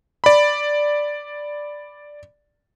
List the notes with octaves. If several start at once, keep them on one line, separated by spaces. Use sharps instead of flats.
D5 B5